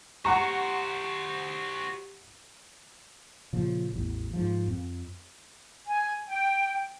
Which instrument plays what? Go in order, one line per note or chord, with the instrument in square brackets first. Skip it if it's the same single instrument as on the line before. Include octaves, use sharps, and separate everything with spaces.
[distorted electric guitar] F#4 C5 [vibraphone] G4 [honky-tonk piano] F#5 A#5 C#6
[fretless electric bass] A#2 C#3 F3
A1 E2
G#2 F3
F2
[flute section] G#5
G5